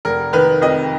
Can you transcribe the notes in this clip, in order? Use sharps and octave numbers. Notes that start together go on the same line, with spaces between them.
F1 A#4
D#3 B4
F2 D#5